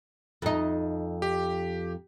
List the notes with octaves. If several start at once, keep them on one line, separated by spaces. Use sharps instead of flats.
F2 D#4
G4